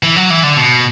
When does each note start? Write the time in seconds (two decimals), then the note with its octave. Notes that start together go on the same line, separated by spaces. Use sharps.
0.03 E3
0.16 F#3
0.30 E3
0.43 D3
0.57 B2